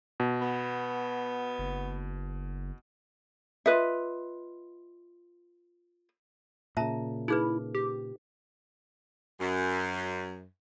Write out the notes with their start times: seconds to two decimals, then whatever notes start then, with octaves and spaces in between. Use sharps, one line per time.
0.20 B2
0.41 B3
1.59 F#1
3.66 F4 B4 D#5 E5
6.77 A#2 C#3 E5 A5 A#5
7.28 D#4 E4 G#4 B4
7.75 G4
9.40 F#2